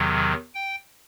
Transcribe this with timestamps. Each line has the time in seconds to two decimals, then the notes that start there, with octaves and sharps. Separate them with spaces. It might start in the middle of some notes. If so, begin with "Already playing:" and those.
Already playing: E2 C3 D#3 F#3
0.55 G5